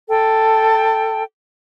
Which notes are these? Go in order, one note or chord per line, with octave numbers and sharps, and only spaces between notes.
A4 G5 A5